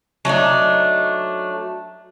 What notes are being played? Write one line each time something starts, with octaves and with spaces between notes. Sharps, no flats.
F#3 A3 D4 D#4